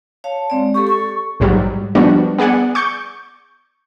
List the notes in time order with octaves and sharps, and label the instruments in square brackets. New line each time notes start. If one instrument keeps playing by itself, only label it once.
[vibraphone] C#5 F5 A5
G#3 C4 D5
[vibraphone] G4 A4 [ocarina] C#6
[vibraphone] A4 [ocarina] C#6
[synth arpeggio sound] A#1 G#2 F#3 G3
F3 G3 B3 D4 F#4
B3 G#4 D5 F#5 G#5
C#6 D6 G6